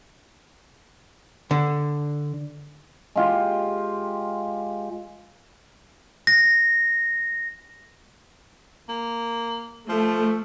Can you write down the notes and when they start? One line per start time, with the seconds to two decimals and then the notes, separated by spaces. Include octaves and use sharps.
1.51 D3
3.15 G#3 F4 G4
6.27 A#6
8.89 A#3
9.89 F3 A3